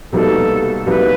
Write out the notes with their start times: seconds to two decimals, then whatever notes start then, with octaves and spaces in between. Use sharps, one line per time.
0.13 C2 B2 G3 A#3 D#4 A4
0.86 C2 B2 G3 A#3 D#4 B4